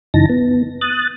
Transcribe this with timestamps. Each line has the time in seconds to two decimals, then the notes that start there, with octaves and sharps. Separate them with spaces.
0.14 F#2 C#3 E3 D#4 A5 A#6
0.29 B3
0.81 D#6 F#6 A6